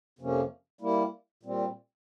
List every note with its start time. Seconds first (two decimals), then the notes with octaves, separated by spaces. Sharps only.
0.19 F2 C3 F3 A#3 C#4
0.81 G3 A#3 E4
1.43 A#2 G3 C4